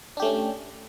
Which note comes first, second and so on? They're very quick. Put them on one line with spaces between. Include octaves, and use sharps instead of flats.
D4 G4 A3 C#4